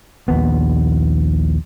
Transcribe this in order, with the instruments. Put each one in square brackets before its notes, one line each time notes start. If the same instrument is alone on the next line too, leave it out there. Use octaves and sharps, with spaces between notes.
[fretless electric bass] A#1 D#2 B3